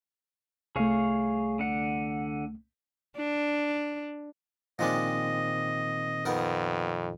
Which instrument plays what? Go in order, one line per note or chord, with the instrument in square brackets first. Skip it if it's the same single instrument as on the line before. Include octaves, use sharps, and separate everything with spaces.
[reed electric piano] C2 A3 [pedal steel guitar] G#4 C#5 F5
[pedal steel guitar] D3 F#5
[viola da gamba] D4
[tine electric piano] A#2 D#3 C4 [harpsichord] F3 G#3 D4 [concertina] D#5
[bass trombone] F2 [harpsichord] B3 D#4 A#4